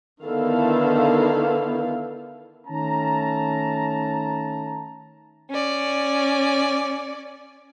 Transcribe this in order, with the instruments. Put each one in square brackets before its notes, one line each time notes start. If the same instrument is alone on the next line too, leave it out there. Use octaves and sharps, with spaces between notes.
[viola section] D3 D#3 B3 E4 A4 F5
[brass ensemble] D#3 A3 C#4 A5 A#5
[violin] C#4 D5